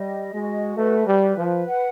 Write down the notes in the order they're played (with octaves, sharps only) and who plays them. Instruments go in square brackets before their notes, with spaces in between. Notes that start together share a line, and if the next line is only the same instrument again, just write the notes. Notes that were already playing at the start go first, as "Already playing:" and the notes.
Already playing: [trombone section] G3 [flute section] D#5
[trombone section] G#3 [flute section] F#4
[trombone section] A3 [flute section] B4
[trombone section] G3
[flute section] B4
[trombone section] F3
[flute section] F#5